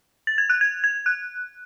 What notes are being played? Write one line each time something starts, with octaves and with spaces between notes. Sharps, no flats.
A6
G#6
F#6
G#6
G#6
F#6